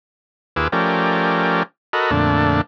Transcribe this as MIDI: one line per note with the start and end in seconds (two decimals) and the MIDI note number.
0.56 0.68 39
0.56 0.68 65
0.56 0.68 68
0.56 0.68 71
0.56 0.68 86
0.56 0.68 88
0.72 1.63 53
0.72 1.63 57
0.72 1.63 61
0.72 1.63 67
0.72 1.63 70
0.72 1.63 74
1.93 2.11 66
1.93 2.11 69
1.93 2.11 70
1.93 2.11 75
1.93 2.11 83
2.11 2.61 41
2.11 2.61 46
2.11 2.61 50
2.11 2.61 57
2.11 2.61 62